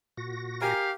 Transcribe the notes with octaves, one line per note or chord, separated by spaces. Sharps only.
A#2 F#4 A#6
G4 A#4 F5 G#5